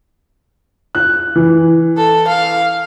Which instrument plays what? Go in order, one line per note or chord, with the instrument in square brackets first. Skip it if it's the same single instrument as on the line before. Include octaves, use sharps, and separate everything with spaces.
[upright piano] F#6
E3
[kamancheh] A4
F5